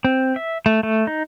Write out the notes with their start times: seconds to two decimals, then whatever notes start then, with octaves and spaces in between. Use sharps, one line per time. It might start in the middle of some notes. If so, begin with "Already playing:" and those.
0.05 C4
0.36 E5
0.66 A3
0.83 A3
1.07 D#4